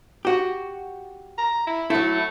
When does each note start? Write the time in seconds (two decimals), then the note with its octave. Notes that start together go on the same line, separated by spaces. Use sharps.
0.25 F#4 G4
1.38 A#5
1.67 E4
1.90 F#3 A3 E4